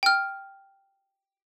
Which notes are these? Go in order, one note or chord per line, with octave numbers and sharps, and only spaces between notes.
G5 F6